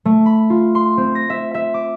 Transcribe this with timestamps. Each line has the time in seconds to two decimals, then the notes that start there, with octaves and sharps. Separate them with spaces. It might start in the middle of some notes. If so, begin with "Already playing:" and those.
0.05 A3
0.26 B5
0.50 F4
0.75 C6
0.97 C4
1.15 A#6
1.30 E5
1.54 E5
1.74 D6